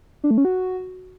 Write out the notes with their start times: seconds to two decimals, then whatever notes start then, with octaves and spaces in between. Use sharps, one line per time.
0.24 D4
0.31 A3
0.38 C#4
0.45 F#4